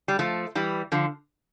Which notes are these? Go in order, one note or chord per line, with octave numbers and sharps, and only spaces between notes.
G3
F3 A3
E3 G3
D3 F3